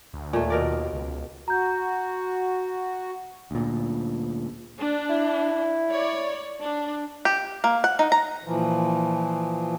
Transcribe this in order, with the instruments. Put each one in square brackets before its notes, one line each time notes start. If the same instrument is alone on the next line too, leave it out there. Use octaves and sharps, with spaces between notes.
[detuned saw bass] D2
[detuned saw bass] D#2 [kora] A#2 A3
[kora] B2 A#4 D5
[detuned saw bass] C#2
[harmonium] F#4 [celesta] A#5 G6
[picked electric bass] D2 A#2
[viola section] D4
[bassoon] E4
[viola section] C#5 D5
D4
[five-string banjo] G4
A#3
F#5
D#4
A#5
[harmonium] A#2 E3 F3